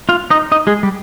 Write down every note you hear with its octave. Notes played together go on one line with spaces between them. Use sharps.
F4 F5
D#4 D#5
D#4 D#5
G#3 G#4
G3 G4